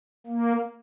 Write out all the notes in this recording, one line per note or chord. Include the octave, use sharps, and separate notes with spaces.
A#3